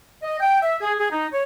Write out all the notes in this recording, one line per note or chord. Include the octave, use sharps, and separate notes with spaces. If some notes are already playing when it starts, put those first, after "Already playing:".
D#5
G5
E5
G#4
G#4
D#4
C#5